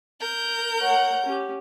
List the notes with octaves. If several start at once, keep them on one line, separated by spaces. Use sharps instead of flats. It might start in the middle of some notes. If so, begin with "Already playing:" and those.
A#4 G6
C#5 F#5
C#4 G4